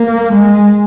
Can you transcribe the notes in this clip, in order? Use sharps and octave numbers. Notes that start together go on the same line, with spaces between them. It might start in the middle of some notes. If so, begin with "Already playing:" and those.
Already playing: A#3
G#3